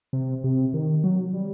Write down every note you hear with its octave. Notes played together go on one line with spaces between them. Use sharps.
C3
C3
D#3
F#3
G3